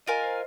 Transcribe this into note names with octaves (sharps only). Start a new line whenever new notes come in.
F4 A#4 D#5 F5 G#5
C5